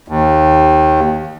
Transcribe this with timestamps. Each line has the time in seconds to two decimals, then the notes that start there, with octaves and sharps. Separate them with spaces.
0.08 D#2